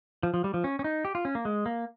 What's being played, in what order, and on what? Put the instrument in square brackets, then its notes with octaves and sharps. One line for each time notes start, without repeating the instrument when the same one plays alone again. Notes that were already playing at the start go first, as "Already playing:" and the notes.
[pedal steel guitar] F3
F3
G3
F3
C#4
C#4
D#4
G4
F4
C#4
A#3
G#3
A#3